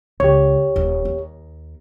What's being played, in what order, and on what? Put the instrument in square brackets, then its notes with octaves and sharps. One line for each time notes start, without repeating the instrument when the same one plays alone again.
[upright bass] C#2 [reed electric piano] G4 C#5
[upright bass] D#1 D#2
D#2